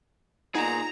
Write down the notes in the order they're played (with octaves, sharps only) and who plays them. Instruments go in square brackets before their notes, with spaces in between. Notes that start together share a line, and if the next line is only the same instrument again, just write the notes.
[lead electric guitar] A#2 G#4 [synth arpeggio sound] B3 D#4 [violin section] A#5